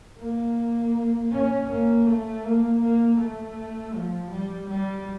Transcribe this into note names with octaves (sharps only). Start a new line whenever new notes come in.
A#3
C#4
A#3
A3
A#3
A#3
A3
F3
G3
G3